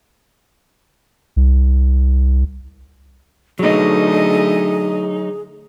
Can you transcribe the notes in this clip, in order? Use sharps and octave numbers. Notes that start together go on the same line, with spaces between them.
C2
D3 F#3 A3 D#4 G#4 D#5